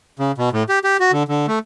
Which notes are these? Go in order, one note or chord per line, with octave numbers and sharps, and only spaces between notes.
C#3
B2
A2
G4
G4
F#4
D3
D3
A3